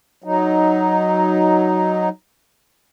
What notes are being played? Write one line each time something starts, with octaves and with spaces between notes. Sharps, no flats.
F#3 D#4